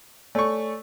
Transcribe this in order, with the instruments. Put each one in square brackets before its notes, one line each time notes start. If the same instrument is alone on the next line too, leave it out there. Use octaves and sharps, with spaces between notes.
[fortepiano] A3 C#6 [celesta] C#5 D5 G#5